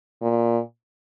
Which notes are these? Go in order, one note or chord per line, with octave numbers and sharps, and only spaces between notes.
A#2